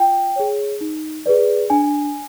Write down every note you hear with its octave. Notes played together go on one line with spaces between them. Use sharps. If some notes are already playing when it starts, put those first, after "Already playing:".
Already playing: F4 G5
G#4 C#5
D#4
G#4 B4 D5
D4 G#5